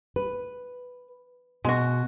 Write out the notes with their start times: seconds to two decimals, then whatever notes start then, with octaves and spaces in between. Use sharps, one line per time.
0.16 B4
1.65 B2 G#3 F#4